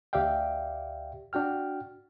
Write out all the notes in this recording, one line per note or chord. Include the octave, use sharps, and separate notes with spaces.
D2 G4 D5 E5 F5 G5
D4 F#4 G5 F6